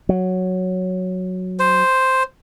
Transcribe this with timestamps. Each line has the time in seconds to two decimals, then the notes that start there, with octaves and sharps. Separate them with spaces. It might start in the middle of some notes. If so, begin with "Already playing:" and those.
0.09 F#3
1.59 C5